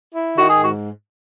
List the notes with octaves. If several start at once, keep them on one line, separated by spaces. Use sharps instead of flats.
E4
D#3 F#4
G#4
G#2 F#4